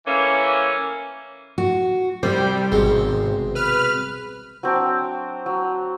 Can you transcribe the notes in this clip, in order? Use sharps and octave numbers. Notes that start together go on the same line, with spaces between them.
E3 A3 A#3 C#4
F#4
C2 C3 G3 C4 C5
G#1 B2 G#3 C4
B4 F6
F#3 C4 D4 G5
F#3